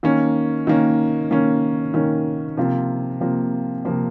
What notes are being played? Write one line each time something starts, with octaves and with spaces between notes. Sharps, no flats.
D#3 A#3 C#4
D#3 A#3 C#4
D#3 A#3 C#4
D#3 A#3 C#4
C3 F3 A#3 F4
C3 F3 A#3 F4
C3 F3 A#3 F4